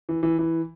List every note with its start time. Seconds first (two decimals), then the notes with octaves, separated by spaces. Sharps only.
0.09 E3
0.23 E3
0.39 E3